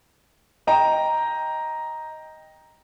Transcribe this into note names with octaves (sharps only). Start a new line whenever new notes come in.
D#5 G5 A#5